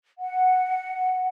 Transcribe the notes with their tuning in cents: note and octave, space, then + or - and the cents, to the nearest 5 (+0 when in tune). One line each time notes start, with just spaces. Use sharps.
F#5 +0